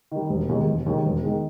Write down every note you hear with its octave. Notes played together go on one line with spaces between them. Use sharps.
D#3 G3
E1
D#2 D#3 G#3
E1
D#2 D#3 G#3
E1
D#3 G#3